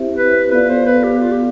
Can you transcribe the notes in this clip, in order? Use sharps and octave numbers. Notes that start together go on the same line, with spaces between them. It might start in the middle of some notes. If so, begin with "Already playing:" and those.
Already playing: C4 E4 G4 C5 E5
B4
B3 F4 A4 B4 D5 F5
C5
B4
G4
F4
G4